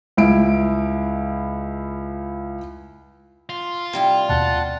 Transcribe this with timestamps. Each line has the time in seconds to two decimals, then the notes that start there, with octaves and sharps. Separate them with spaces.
0.17 C#2 E4 D7
3.49 F4
3.93 C3 G3 E4
4.29 D#2 B2 F#5 A5